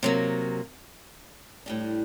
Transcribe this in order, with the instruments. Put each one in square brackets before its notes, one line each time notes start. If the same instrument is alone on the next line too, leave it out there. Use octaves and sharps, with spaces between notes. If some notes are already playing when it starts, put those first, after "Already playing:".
[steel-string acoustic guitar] C3 F#3 A#3
A2 G3 D4